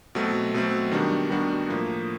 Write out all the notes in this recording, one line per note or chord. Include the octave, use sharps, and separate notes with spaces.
B2 F#3 A3 C4
B2 F#3 A3 C4
D#3 G3 B3 D4 F#4
D#3 G3 B3 D4 F#4
A2 F3 A#3